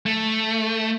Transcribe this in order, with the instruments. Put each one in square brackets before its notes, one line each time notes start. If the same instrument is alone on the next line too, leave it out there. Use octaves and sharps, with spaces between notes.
[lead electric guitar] A3